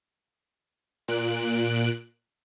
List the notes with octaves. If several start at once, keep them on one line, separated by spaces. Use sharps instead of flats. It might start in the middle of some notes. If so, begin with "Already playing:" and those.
A#2 F#6 D7